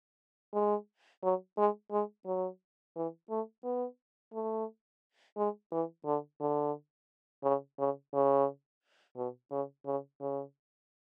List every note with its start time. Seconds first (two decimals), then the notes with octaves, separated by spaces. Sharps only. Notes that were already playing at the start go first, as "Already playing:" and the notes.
0.54 G#3
1.22 F#3
1.57 G#3
1.91 G#3
2.26 F#3
2.96 E3
3.30 A3
3.64 B3
4.33 A3
5.37 G#3
5.72 E3
6.05 D3
6.40 D3
7.43 C#3
7.79 C#3
8.13 C#3
9.16 B2
9.51 C#3
9.86 C#3
10.21 C#3